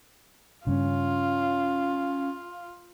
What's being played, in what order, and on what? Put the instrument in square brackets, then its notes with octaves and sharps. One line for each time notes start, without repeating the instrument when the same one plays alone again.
[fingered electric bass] G2 C#3 [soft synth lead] C#4 [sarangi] F4